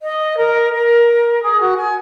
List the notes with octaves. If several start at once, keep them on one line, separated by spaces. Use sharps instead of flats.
D#5
A#4
A#4
G#4
F#4
G#5